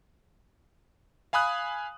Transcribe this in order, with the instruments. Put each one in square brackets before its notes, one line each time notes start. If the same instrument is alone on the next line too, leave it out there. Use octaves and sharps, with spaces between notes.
[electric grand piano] F5 G#5 B5 D#6 F#6